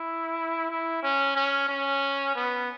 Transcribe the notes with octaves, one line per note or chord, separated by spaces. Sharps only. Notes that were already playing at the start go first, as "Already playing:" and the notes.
Already playing: E4
E4
C#4
C#4
C#4
B3